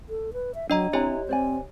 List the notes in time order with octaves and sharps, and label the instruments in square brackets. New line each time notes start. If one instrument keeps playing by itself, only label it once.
[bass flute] A4
B4
E5
[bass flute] F#3 [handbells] D4 D#5 A#5
[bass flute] C4 [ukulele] E4 G#5 A#5 [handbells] G4 C#5 D#5
[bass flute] C4 [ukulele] C5 D5 G#5